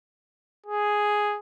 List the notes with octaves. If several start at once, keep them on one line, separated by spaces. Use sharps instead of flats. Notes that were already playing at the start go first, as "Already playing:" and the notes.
G#4